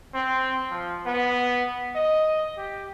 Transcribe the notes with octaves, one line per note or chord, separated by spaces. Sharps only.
C4
F3
B3
D#5
G4